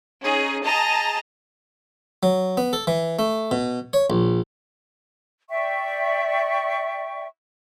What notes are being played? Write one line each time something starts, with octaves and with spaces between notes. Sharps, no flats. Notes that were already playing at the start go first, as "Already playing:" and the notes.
C#4 D#4 G#4
G#4 D#5 A5 A#5
F#3
B3
A4
E3
A3
B2
C#5
A#1
D5 E5 G5 C#6